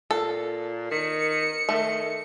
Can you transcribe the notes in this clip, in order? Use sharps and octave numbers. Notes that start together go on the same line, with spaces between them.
A#2 A4
D#3 C#7
D#3 A3